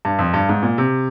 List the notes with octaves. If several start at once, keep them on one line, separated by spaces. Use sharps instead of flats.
G2
F2
G2
G#2
A#2
C3